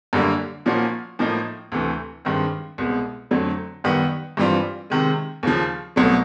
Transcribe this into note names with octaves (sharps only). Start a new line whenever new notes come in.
F#2 D3 G3 A#3
A#2 F3 A#3 C#4 F#4
A2 F3 A#3 D#4
D2 C3 E3 A3
G2 D#3 G#3 C4
C2 B2 G#3
F2 D3 F#3 A3
F#2 D#3 G3 B3
G2 E3 G3 C4 F4
C3 D#3 G#3
D#2 C#3 F3
C2 B2 F#3 A3